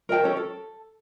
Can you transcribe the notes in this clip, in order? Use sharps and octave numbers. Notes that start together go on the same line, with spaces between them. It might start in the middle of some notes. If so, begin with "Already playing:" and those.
A#4 D#5 G5 A5
C#4 A4 C#5
A4